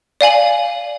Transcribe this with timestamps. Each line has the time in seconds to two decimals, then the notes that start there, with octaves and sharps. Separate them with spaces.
0.21 D5 F5 G#5 F#7